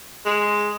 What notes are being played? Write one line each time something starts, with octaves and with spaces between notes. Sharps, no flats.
G#3